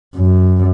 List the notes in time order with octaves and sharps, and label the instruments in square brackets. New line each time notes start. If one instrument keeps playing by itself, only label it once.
[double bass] F#2